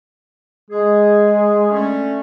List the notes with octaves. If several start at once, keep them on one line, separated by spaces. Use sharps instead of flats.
G#3 G#4
D3 A3 C#4